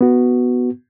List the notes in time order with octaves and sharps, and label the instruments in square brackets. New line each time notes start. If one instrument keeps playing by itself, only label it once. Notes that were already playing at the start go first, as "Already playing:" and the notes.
[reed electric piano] B3 F#4